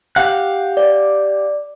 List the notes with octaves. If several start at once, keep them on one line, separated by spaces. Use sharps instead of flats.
G4 F5 F#5
D5